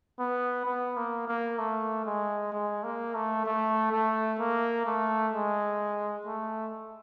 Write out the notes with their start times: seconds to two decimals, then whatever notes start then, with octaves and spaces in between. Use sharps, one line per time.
0.19 B3
0.66 B3
0.97 A#3
1.28 A#3
1.58 A3
2.05 G#3
2.52 G#3
2.83 A#3
3.15 A3
3.46 A3
3.92 A3
4.39 A#3
4.86 A3
5.33 G#3
6.26 A3